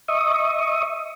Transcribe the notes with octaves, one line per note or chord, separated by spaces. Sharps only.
D#5 E5 C#6 D#6